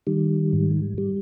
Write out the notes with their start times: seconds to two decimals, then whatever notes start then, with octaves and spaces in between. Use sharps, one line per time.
0.07 D#3 G3
0.53 G#2
0.98 G3